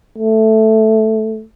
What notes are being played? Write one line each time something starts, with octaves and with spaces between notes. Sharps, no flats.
A3